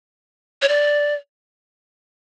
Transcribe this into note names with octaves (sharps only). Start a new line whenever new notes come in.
C#5
D5